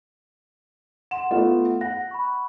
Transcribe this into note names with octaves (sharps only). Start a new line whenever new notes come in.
F#5 C6 E7
A3 B3 F4
F#5 A#6
B5 C#6